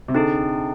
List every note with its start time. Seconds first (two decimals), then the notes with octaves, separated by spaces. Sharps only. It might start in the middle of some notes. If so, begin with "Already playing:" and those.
0.08 C3
0.14 D3 C4 D#4 G#4